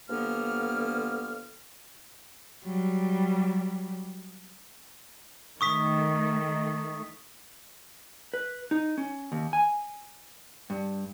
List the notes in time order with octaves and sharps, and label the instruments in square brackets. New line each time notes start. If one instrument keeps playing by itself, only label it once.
[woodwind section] G2 D3 F3 A#3 B3 F6
[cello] F#3 G3
[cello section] D#3 A3 [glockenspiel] C#6 D#6 B6
[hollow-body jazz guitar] B4
D#4
C#4
D#2
G#5
G2